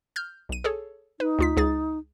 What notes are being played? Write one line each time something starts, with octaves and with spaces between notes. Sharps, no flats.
F6 G6
B1 D#7
G#4 A4 C#5
D#4 B4
D2 F4 B6
C#2 G#4 A6